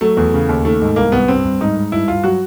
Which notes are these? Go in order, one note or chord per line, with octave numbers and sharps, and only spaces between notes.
F#3 A3
E2
C#3
D#2
D#3 A3
G#2
C2 A#3
C2 B3
G2 C4
G2
G#2 D#4
G#2
G2 E4
G2 F4
F#3 F#4